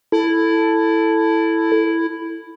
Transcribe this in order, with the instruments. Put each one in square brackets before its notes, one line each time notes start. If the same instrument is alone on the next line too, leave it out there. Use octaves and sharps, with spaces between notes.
[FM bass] E4 [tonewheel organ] A4